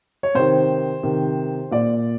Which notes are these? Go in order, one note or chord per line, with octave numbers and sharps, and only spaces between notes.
C#5
C3 D#3 C5
C3 D#3
A#2 D5